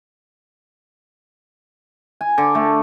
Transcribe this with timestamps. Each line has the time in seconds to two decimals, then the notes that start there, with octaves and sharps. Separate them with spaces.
2.21 G#5
2.38 D3
2.55 A3